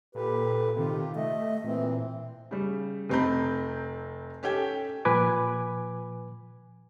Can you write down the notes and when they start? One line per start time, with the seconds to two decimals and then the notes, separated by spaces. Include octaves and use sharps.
0.15 A#2 G4 A4 B4
0.76 C3 D#3 F4 G4
1.16 A3 D#5 E5
1.64 A#2 E3 C4
2.51 C#3 G3
3.09 F1 A3 C4 A#5 B5 G6
4.43 C#4 G4 A4 G5 G#6
5.05 A#2 F3 B4 G#5 D6